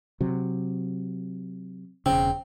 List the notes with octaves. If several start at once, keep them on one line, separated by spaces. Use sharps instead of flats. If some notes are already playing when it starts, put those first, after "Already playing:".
C3 F#3
E1 C#3 C4